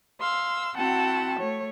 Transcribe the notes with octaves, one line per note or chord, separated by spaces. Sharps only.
F5 C6 E6
C4 E4 F#4 F#5 G5 A5
A3 C#5